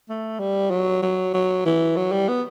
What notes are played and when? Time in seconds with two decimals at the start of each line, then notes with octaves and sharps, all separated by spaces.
0.09 A3
0.40 G3
0.71 F#3
1.02 F#3
1.34 F#3
1.65 E3
1.96 F#3
2.12 G3
2.28 B3